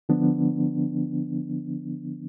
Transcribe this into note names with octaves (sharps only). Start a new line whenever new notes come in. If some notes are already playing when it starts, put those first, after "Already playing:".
D3 F3 B3 D4